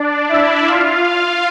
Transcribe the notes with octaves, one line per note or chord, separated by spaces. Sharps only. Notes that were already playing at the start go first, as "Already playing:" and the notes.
Already playing: D4 D5
E4 E5
F4 F5
F4 F5